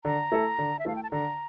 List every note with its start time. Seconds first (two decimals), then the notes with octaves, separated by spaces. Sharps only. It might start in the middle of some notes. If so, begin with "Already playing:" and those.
0.04 D3 A#5
0.32 A3 E4 A4
0.59 D3
0.79 E5
0.85 A3 E4 A4 F5
0.96 G5
1.03 A5
1.11 D3 A#5